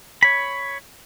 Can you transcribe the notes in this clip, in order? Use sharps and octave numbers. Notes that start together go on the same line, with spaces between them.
C#5 B5